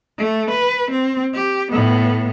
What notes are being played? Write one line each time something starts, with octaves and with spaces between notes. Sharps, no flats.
A3
B4
C4
G4
A2 B3